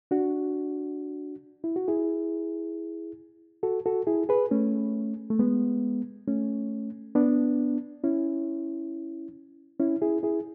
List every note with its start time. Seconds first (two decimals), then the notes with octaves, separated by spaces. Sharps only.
0.11 D4 F#4
1.64 E4
1.76 F#4
1.88 E4 G#4
3.63 F#4 A4
3.86 F#4 A4
4.07 E4 G#4
4.29 G#4 B4
4.51 A3 C#4
5.30 A3
5.39 G#3 B3
6.28 A3 C#4
7.15 B3 D4
8.04 C#4 E4
9.79 C#4 E4
10.02 E4 G#4
10.23 E4 G#4